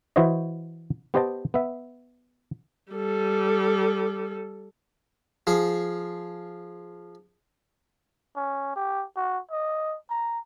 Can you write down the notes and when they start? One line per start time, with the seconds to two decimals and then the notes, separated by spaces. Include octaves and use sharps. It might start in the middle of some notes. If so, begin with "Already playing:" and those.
0.16 E3 E4 F#4 C5 C#5 D#5
1.14 B3 G4 C5 D#5 G5 A5
1.54 B3 E5
2.92 G3 A4
5.47 F3 G#4
8.36 C#4
8.76 G4
9.16 F#4
9.52 D#5
10.10 A#5